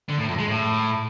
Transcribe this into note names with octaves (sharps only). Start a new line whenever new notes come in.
D3
A2
F2
G#3
A2